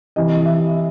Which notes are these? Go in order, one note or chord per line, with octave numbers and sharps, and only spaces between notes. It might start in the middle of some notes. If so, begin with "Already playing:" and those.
C3 E3 D#5
E5